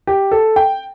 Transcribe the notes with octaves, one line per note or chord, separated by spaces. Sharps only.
G4
A4
G5